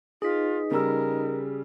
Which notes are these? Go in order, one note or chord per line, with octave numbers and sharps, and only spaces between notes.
D#4 F4 G#4 B4 D#5 B6
C#3 G3 A#4 E6